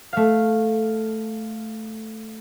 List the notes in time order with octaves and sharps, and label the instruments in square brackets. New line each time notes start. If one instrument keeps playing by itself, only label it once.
[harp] A3 F5